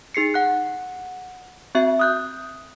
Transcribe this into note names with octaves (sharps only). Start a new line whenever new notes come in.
D#4 G#4 C7 C#7
F#5 F#6
C4 F#4 E5
D#6 F#6 G6